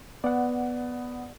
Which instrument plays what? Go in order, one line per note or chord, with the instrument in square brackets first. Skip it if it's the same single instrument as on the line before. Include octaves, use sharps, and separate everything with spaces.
[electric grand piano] B3 [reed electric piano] D5 F#5